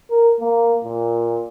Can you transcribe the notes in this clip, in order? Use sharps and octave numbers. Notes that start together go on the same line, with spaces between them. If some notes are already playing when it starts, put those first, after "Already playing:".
A#4
A#3
A#2